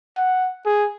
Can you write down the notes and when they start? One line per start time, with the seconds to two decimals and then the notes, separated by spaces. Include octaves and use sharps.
0.17 F#5
0.66 G#4